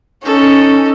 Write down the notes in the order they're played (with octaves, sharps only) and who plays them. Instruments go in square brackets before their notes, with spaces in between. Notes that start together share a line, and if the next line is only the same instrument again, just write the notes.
[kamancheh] C#4 [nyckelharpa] D#4 A4